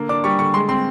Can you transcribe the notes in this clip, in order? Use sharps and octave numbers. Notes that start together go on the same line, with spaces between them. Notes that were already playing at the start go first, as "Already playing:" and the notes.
Already playing: D3 A#3
D4 D6
G3 C#6
D3 C#6
G#3 C6
C4 C6